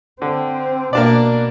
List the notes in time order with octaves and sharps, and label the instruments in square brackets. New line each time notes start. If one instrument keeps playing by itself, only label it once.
[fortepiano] D3 [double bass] C4
[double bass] B2 [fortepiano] A#3 D4 D5